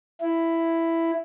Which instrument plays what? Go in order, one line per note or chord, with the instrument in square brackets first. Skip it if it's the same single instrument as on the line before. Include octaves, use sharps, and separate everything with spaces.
[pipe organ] E4